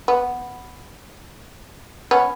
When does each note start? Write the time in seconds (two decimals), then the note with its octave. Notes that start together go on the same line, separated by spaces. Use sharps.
0.08 B3
2.11 B3 C#4